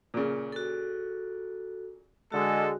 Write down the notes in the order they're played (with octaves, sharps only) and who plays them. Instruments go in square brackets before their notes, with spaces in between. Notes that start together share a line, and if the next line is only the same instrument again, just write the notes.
[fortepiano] A#2 C#3
[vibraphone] F#4 A4
[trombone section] D3 G#3 [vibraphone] F#4 [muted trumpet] A4